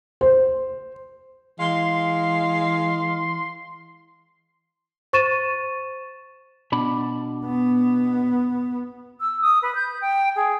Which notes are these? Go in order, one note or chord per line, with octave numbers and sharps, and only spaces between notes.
C5
E3 G#3 F5 C6
C5 C#6 A6 D#7 E7
B2 D4 B5
B3
E6
D#6
B4
G6
G5
G#4